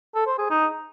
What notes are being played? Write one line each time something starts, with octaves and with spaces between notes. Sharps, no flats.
A4
C5
G#4
D#4